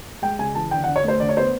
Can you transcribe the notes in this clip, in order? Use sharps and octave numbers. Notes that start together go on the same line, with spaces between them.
G#3 G5
C#3 G#5
E3 A5
D3 G5
F#5
D3
C#5
A3 C5
D3 D5
C#5
B3 C5